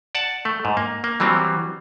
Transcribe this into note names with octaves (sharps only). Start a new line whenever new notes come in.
D5 F#5 A5
A3
G#2
A#3
A#3
E3 F#3 G3 C4